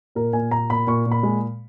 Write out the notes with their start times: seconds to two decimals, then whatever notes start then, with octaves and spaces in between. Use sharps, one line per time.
0.15 A#2 A#4
0.33 A#2 G#5
0.51 A#2 A#5
0.70 A#2 B5
0.87 A#2 C#6
1.06 A#2
1.12 B5
1.23 G#3